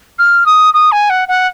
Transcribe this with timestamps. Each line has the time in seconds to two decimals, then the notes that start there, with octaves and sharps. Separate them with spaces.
0.18 F6
0.46 D#6
0.74 D#6
0.92 G#5
1.10 F#5
1.28 F#5